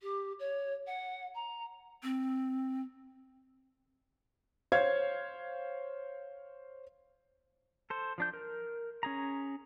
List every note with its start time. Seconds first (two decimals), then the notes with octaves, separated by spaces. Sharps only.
0.01 G4
0.39 C#5
0.87 F#5
1.35 A#5
2.03 C4
4.72 C5 C#5 F5 G#6
7.90 A4 C5
8.18 F3 D4 G6
8.34 A#4
9.03 C#4 G#4 A#5